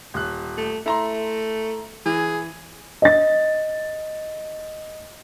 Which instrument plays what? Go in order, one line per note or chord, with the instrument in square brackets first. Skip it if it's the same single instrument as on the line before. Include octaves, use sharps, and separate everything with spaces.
[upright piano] D#1 F#6
[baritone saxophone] A3
[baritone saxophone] A3 [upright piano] E4 A#5 C6
[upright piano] E3 [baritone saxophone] G#4
[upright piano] D#5 A6